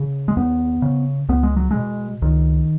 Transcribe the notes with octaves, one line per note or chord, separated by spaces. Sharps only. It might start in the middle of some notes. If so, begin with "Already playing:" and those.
Already playing: C#3
G#3
D#2 B3
C#3
C#2 B3
G#3
F#3
G#3
B2
C#2 D#3